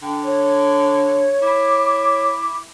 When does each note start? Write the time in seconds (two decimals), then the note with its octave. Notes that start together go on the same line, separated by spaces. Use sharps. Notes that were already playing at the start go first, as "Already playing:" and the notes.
0.02 D3 G5
0.23 C#5
1.42 E4 D6